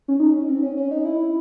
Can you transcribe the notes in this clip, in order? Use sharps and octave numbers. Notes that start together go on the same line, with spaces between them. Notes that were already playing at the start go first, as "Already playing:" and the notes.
C#4
D#4
C#4
C4
C#4
C#4
D#4
E4